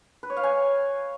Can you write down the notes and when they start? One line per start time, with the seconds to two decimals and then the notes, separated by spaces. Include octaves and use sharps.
0.23 B4
0.30 C#5
0.37 F5
0.43 G#5